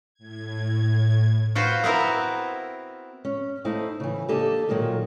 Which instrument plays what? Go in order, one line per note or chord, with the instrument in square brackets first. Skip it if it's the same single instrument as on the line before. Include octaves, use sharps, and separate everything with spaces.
[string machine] A2 G#6
[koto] F4 F#4 B4 C5
B3 C4 E4 A#4 B4
[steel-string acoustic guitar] C#4
A3 D#4 E4 C5 F5
C#3 E3
A#3 D4 G4 A4 D#5
A#2 D#3 F#3 A#3 F#4